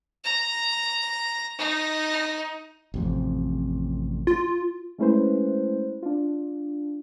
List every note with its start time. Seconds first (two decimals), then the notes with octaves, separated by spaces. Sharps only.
0.24 A#5
1.59 D#4
2.94 A1 F2 C3
4.27 F4
4.98 G#3 A3 C#4 E4 B4 C5
6.02 D4 F4